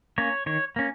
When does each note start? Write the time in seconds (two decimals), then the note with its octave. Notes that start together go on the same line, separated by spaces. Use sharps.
0.18 A#3 C#4 C#5
0.46 D#3 C#5
0.76 A#3 C#4